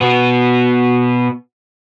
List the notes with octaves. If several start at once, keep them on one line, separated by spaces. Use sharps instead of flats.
B2 B3